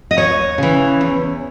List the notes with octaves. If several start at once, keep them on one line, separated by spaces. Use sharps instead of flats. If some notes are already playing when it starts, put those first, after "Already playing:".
D#5
D#2 C#5
C#3 E3
E2